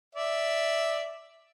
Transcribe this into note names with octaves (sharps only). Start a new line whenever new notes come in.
D5 E5